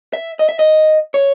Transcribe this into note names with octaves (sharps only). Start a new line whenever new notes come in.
E5
D#5
E5
D#5
C#5